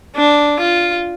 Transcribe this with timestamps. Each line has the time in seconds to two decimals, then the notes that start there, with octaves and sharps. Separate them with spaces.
0.16 D4
0.60 F4